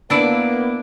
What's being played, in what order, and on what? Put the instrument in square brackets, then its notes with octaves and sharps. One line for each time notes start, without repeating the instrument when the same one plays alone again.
[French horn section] A#3 B3 [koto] D4 E4 D5